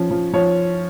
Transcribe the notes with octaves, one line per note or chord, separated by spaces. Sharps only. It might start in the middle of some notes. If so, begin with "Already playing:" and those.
Already playing: F3 C#4
F3
F3 C#5